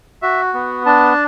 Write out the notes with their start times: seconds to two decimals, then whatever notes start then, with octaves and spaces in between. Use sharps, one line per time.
0.22 F#4 E5
0.54 B3
0.86 D4 A5